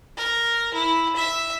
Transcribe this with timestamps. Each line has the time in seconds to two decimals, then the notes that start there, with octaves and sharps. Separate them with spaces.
0.17 A#4
0.74 E4
1.17 E5